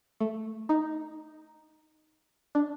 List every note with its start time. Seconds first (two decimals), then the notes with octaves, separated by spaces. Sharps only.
0.20 A3
0.69 D#4
2.55 D4